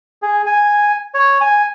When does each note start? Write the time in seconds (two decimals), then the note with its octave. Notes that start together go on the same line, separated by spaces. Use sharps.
0.22 G#4
0.46 G#5
1.14 C#5
1.41 G#5